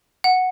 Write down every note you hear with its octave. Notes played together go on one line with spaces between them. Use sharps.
F#5